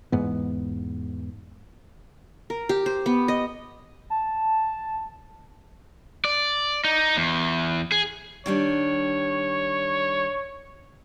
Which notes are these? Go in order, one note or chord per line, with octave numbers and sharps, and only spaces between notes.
E2 G#2 B3
A#4
G4
C5
B3
D#5
A5
D5
D#4
E2
G#4
D#3 G3 D4 C#5